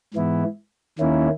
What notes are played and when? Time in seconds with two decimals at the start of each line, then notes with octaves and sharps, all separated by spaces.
0.14 G#2 E3 B3 E4
0.99 D#2 D#3 A#3 C#4 E4